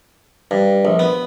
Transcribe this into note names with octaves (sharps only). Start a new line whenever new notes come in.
G2
A#1
B3